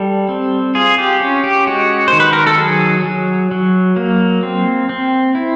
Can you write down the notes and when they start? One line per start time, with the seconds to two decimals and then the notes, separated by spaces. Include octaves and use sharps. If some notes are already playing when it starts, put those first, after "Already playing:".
Already playing: G3 A4
0.29 C4
0.75 F4 G#4
0.98 G4
1.20 C#4
1.44 G4
1.67 G#3 F#4
2.08 D#3 C5
2.20 B4
2.33 A#4
2.47 A4
2.58 F#3 G#4
3.04 F#3
3.51 F#3
3.96 A#3
4.43 C4
4.89 C4
5.35 E4